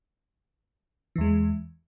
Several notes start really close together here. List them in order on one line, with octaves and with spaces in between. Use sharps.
E3 E2 G#3